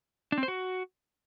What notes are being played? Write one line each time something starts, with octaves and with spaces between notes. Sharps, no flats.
D4
C4
C5
F#4